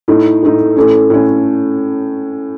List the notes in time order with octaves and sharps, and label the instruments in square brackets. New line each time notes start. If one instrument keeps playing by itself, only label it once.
[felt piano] A2 A3 D#4
A2 A3 D#4
A2 A3 C#4
A2 A3 C#4